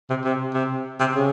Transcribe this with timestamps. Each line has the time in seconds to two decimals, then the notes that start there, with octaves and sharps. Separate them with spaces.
0.10 C3
0.24 C3
0.54 C3
1.00 C3
1.15 C#3